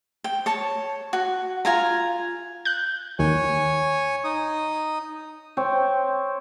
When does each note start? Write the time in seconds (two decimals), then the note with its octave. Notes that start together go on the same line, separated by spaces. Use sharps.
0.24 G5
0.46 C#5 A5
1.13 F#4
1.65 F4 G#5 A#5
2.65 F#6 G6
3.19 D#2 C#5 G#5
4.24 D#4 D#6
5.57 C4 C#5 G5